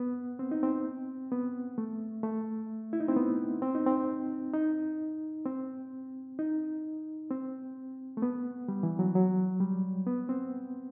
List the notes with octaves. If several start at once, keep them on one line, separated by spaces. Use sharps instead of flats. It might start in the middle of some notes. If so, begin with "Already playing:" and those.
Already playing: B3
C4
D#4
C4
B3
A3
A3
E4
D#4
C4
B3
C4
D#4
C4
D#4
C4
D#4
C4
A3
B3
G3
E3
F#3
F#3
G3
B3
C4